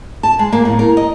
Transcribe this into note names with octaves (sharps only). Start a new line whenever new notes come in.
A5
G#3
A#3
A2
A#4
D#5